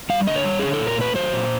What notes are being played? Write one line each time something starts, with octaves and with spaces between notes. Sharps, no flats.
G3 F5
D3 D#5
C#5
G3
D3 G#4
A4
A#2
A#4
A3 B4
F#3 C5
A#2